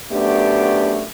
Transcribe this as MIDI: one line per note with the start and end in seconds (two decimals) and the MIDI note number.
0.12 1.04 42
0.12 1.04 57
0.12 1.04 59
0.12 1.04 62
0.12 1.04 67